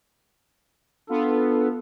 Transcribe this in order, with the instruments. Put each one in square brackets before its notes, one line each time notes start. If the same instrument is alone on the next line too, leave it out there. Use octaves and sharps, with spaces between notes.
[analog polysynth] B3 F4 [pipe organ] D4 A4